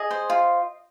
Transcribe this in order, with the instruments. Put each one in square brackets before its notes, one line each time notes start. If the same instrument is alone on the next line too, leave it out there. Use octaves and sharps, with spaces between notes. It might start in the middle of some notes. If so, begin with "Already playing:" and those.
Already playing: [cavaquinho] G#4 D#5
C5
F4